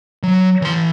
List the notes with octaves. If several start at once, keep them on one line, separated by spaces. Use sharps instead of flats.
F#3
E3 C6